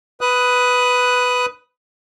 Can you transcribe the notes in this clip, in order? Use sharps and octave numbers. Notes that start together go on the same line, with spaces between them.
B4 D#6 F#6